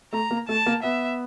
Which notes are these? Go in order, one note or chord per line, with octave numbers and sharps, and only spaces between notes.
A3 A#5
A#3
A3 A5
A#3
B3 E5